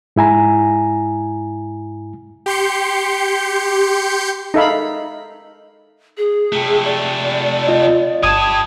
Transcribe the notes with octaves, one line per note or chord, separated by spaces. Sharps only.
G#2 E4 G#5 A#5
G4 C6 G6 C#7
D#4 A4 E5 F5 B5
G#4
C3 A3
D5
F4 D#5
G1 G3 A5 D#6 G#6